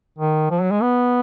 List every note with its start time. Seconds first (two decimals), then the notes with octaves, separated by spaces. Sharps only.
0.19 D#3
0.51 F3
0.61 F#3
0.71 G#3
0.82 B3